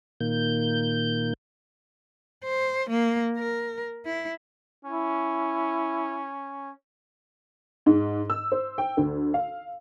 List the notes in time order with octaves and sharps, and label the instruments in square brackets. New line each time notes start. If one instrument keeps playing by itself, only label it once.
[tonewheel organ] A#2 D#3 A#3 G6
[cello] C5
A#3
A#4
E4
[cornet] C#4 [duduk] E4
[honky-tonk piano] G#2
E6
C5
G5
D2
F5